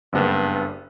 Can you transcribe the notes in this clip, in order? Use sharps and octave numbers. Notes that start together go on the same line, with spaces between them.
F#1 G2 B3